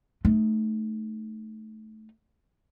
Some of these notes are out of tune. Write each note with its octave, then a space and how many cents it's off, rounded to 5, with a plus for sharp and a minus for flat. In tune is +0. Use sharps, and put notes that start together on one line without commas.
A3 -15 D#4 -15